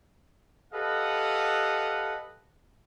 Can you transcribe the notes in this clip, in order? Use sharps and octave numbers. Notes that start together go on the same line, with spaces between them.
G4 A4 B4 D#5 F5 F#5